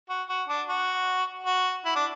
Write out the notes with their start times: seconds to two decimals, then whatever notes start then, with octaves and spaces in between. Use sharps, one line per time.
0.10 F#4
0.29 F#4
0.48 D4
0.69 F#4
1.46 F#4
1.85 E4
1.96 D4